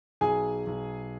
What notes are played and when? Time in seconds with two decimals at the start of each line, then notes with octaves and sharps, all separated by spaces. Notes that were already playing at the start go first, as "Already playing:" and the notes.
0.21 B1 G#4 G#5
0.66 B1